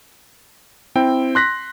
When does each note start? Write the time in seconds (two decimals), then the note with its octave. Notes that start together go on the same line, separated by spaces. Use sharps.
0.95 C4 E4 G5
1.35 C6 F#6 A#6 B6